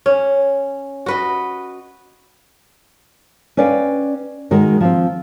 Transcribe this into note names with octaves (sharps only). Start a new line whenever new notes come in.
C#4
F#4 B4 D#5
C#4 B4 D5 F5 G5
D#3 G#3 D#4 F#4 A#4
F3 C4